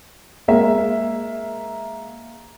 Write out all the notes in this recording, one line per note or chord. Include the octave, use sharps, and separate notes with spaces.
G#3 A#3 E5